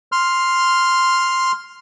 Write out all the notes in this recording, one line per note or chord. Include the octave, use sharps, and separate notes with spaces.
C6 F6